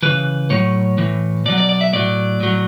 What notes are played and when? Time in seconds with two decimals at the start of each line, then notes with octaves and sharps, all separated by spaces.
0.03 C#3 E3 B4
0.50 A2 F#3 C#5
0.98 A2 E3
1.45 B2 D5
1.50 F#3
1.58 D5
1.69 D5
1.81 E5
1.93 A2 F#3 D5
2.40 A2 F#3